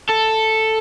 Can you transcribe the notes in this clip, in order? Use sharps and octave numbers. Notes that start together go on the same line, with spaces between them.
A4